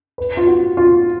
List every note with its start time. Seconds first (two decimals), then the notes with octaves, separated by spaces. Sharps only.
0.18 B4
0.37 F4
0.47 F#4
0.77 F4